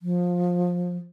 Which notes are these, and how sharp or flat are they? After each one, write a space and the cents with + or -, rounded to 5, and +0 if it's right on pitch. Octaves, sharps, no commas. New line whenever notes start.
F3 +20